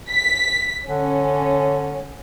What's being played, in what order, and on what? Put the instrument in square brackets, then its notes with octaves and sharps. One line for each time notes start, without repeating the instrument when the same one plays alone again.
[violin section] B6
[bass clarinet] D3 [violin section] C#4